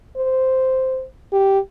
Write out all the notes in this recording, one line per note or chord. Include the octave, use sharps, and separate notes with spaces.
C5
G4